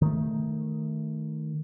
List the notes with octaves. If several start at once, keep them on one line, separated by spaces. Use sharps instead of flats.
D#3 A3